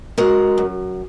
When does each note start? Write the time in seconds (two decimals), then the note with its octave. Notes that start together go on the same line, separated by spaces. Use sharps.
0.18 G#3 F#4 A#4
0.58 F#2